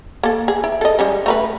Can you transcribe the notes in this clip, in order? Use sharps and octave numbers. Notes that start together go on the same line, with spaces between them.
A#3 A4
G#4
E4
A4 D#5
G3 G#3 C#4
A3 A#4 B4